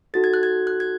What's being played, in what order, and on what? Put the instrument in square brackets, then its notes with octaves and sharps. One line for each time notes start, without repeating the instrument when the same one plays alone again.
[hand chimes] D#4 F#4 A4 A6
G#6
F#6
G#6
F#6
G#6